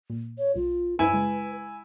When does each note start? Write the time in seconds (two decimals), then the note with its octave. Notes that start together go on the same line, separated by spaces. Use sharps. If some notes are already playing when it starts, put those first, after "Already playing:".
0.10 A#2
0.38 C#5
0.56 B1 F4
0.99 F#2 E4 B4 G#5 E7
1.12 C#3 G#3